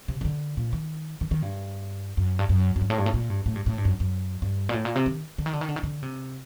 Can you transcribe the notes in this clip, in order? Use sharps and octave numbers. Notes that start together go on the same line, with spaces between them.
C3
D#3
D3
A#2
D#3
D#3
D#3
G2
F#2
G2
F#2
F#2
G2
A2
G2
A2
A#2
G2
A2
G2
A2
G2
F#2
F#2
G2
A#2
A2
A#2
C3
D#3
D3
D#3
D3
D#3
D3
D#3
D3
C3